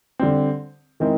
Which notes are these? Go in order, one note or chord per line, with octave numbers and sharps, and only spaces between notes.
D3 G3 C4
D#3 G#3 C4 E4